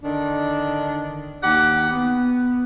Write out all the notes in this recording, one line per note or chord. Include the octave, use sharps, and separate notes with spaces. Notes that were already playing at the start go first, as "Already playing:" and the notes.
D3 D#3 D4
D#2 G4 F#5
B3